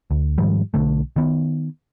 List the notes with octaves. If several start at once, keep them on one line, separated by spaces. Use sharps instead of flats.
D2
G#2 D#3 F3 G3
B1 D3 A3
D#3 B3